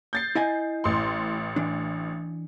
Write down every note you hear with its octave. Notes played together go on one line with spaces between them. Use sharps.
G6 A6 C7
E4 D#5 G#5
A1 C6
E3 D4